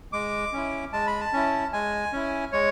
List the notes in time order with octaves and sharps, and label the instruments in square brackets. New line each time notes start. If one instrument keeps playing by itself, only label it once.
[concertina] G#3 D6
C#4 E4
G#3 A5
B5
A5
C#4 E4
G#3 G#5
C#4 E4
G#3 C#5